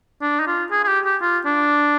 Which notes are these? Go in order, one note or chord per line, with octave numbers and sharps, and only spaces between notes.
D4
D#4
F4
G#4
G#4
G4
G4
F4
D4